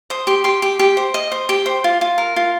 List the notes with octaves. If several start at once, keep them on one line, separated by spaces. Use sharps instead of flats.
C5 D#6
G4 C6
G4 C6
G4
G4
C5
D#5
C5
G4
C5
F4
F4
A#4
F4